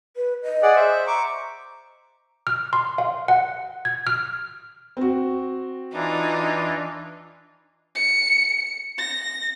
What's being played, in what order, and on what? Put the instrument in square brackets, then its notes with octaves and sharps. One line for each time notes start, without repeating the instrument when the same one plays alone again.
[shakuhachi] B4
D#5
[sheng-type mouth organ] G#4 D5 F#5
C5 E5
[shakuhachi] A#5 [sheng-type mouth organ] C#6 D6
[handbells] F6
C6
F5
F#5
G#6
F6
[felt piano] C4 F#4
[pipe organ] E3 D4 [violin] D#4 F4
[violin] C#7
A#6